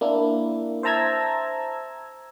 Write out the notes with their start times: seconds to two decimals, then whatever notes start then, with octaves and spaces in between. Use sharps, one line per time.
0.01 A#3 D4 E4
0.83 C5 E5 A5 A#5 E6 G#6